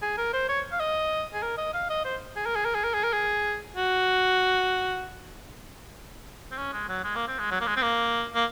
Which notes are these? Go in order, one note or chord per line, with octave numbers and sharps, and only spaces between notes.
G#4
A#4
C5
C#5
F5
D#5
G#4
A#4
D#5
F5
D#5
C5
G#4
A#4
G#4
A#4
G#4
A#4
G#4
A#4
G#4
F#4
C4
C#4
G#3
F#3
G#3
A#3
C4
G#3
F#3
A#3
G#3
C4
A#3
A#3